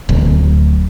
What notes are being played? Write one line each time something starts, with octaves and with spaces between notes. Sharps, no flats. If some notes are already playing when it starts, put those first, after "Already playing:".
D1